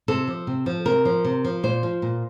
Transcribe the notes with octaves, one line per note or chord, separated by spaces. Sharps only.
C3 A4
F3
C3
F3
C3 A#4
F3
C3
F3
A#2 C5
F3
A#2